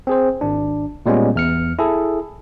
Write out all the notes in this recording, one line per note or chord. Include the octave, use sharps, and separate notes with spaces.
C4 G#4 C5
G#1 D4
A#2 G3 G#3 B3 C#4
E2 F6 C#7
E4 G#4 A4